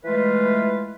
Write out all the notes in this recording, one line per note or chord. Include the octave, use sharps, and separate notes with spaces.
E3 G#3 A3 F4 B4